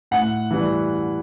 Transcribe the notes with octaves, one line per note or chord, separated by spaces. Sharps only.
A2 F#5
E3 G3